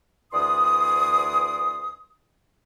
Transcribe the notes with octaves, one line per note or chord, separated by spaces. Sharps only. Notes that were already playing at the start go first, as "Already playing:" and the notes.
D2 E3 D5 C6 D#6